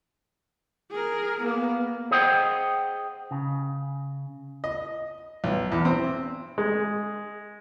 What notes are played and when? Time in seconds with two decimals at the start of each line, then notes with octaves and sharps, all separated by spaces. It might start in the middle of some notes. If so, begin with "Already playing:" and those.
0.91 G#4 A#4
1.40 A#3 B3
2.11 G#4 C5 D#5 F#5 G5
3.31 C#3
4.64 D#5
5.44 B1
5.72 E2
5.85 C4
6.58 G#3